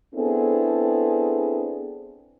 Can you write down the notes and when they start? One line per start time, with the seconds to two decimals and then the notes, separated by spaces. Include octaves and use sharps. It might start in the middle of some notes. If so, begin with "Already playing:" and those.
0.15 B3 C4 D4 E4 G#4 A4